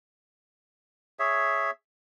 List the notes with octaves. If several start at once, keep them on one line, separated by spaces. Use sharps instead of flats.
G#4 C#5 E5